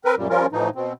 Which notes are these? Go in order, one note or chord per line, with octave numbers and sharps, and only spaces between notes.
C4 A#4 B4
F#2 A#2 G3
F3 G3 C#4 F4 A#4
A2 E3 F3 D#4
B2 C4